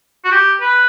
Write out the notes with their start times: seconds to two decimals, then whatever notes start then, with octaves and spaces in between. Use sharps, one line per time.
0.25 F#4
0.32 G4
0.61 B4